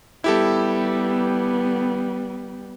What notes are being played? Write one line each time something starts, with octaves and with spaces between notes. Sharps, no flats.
G3 B3 E4 G4 A4